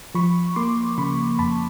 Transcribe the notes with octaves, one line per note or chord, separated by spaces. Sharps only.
F3 B5 C#6
A#3 C6 D6
C#3 B5 C#6
F2 A5 B5